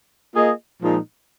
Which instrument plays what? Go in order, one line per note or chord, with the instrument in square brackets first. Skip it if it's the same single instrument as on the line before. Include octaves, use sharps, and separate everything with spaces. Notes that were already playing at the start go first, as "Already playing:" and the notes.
[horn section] A#3 F4 G#4 D#5
A#2 F3 G#3 D#4